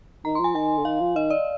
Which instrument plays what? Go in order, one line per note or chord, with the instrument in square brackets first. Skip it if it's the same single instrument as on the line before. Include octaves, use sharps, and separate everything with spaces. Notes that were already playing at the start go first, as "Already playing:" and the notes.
[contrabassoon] D#3 [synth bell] A#5
[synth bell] C6
[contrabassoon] F3 [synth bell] G#5
[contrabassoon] D#3 [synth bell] G#5
[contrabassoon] D3
[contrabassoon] D#3 [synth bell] F5
[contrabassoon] F3
[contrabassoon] D#3 [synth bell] D#5
[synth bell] D5